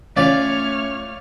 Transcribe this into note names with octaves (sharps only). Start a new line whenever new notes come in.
A3 C#4 F4 C#5 D5 F5 D6 F6